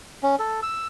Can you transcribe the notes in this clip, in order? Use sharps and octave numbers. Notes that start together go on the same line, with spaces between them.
C#4
A4
E6